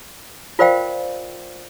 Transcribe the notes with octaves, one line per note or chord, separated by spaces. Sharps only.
F4 A#4 C5 D5 F5 G5